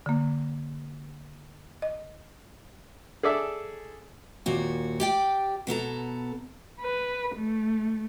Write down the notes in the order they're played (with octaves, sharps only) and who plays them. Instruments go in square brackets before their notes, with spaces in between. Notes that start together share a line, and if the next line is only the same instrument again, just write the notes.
[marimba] D3 A#3
D#5
[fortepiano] G#4 A4 D5 E5
[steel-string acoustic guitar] D#2 A#2 F#4
G4 D5 G5
B2 B3 A4 A#5
[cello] B4
A3